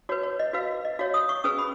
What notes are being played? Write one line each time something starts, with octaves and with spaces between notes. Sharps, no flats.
F#4 B4 C#5
C#5
D#5
F#4 B4 F5
D#5
F#4 C#5 F5
D#6
C#6
C#4 G#4 B4 D#6
B5